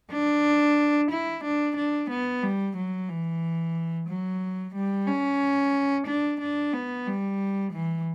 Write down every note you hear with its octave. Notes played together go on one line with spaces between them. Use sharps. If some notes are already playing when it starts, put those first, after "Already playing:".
D4
E4
D4
D4
B3
G3
F#3
E3
F#3
G3
C#4
D4
D4
B3
G3
E3